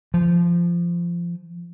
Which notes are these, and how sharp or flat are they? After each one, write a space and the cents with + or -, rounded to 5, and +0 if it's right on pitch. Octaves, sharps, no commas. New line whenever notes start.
F3 -20